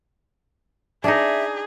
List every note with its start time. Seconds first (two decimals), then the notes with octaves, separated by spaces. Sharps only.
1.04 D4 D#4 G#4 E5